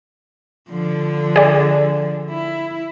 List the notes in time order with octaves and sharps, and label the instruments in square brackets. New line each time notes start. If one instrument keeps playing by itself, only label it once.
[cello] D3 F3
[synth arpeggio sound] G#4 D5
[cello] E4